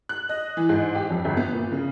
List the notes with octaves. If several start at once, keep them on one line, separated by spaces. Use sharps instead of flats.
F#6
D#5
E3
G#2
G4
F2
G1
B3
A#2
C#3